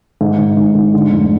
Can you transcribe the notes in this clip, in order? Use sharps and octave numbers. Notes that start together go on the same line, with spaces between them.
G#2
G#2
G#2
G#2
D3
F1